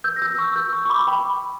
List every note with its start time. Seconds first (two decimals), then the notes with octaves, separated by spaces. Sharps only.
0.04 E6 G6
0.16 A#6
0.22 E6 G6
0.38 C#6 E6
0.56 E6 G6
0.73 C#6 E6
0.85 C#6
0.90 B5 D6
1.07 G5 B5